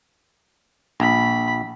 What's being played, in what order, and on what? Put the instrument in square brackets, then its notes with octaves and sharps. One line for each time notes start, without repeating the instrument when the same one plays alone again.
[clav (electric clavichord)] A#1 [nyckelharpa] B5